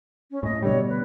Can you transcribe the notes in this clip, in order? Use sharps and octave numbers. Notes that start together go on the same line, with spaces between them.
C#4
A2 D#5
B2 D3 G3 C#5
B4